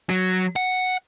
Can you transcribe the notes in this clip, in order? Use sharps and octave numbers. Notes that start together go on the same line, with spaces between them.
F#3
F#5